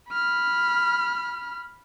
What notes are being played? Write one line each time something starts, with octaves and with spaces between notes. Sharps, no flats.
B5 F6